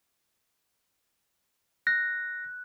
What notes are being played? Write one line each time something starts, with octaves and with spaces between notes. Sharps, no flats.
F#6 A#6